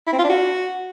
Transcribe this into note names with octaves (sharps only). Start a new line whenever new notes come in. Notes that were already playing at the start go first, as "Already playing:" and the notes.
E4
C4
F4
D4
F#4